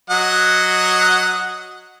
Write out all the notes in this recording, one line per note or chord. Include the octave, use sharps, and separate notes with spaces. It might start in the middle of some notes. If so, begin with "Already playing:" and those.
F#3 D#5 F#5